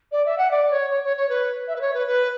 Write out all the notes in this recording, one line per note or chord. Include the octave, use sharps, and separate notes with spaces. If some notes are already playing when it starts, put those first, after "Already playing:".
D5
E5
F#5
D5
C#5
C#5
C#5
C#5
B4
E5
B4
C#5
B4
B4